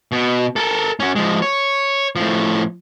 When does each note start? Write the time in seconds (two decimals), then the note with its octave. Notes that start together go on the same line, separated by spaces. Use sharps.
0.12 B2
0.56 A4 A#4
1.00 C#4 F#4
1.16 F3 G#3
1.42 C#5
2.16 A2 F3